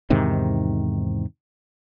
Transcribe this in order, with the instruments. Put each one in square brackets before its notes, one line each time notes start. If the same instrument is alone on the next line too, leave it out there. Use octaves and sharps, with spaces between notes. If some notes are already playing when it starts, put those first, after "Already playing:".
[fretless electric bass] E2 G#2 C3 D#3